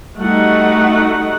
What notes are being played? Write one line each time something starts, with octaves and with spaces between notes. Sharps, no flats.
G3 A3 D#4 F#4 F#5